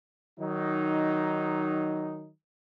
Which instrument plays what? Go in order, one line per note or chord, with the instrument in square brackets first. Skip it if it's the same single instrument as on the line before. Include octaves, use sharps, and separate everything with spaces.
[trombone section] D#3 F#3 D#4